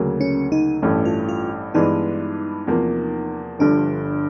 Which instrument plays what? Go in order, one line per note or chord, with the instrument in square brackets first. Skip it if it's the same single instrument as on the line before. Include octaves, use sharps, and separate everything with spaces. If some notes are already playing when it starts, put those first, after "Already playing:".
Already playing: [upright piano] D2 C#3 F#3 A#3
[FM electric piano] C#4
D#4
[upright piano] A1 G2 E3 A3 C#4
[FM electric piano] F4
F4
[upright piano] G2 E3 G#3 B3 D4 [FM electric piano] D#4
[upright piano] E2 C3 F3 A#3
[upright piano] G1 G2 D3 F3 [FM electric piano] D4